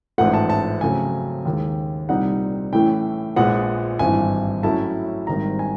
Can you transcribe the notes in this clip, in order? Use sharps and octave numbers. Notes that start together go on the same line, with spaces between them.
A1 G#2 F3 A3 F#5
A5
A5
F2 C#3 F#3 A3 G#5
D#2 D#3 G#3
C2 A#2 G3 C4 D#4 F#5
A2 E3 A3 C#4 G5
A#1 A#2 F3 G#3 B3 F#5
G#1 G2 E3 G#5
A2 F#3 A3 C#4 E4 A5
G#1 G#2 D#3 G3 A#5
G#5